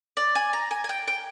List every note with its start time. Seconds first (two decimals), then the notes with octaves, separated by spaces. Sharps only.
0.17 D5
0.35 G#5
0.53 A#5
0.71 G#5
0.84 G#5
0.89 G5
1.08 G5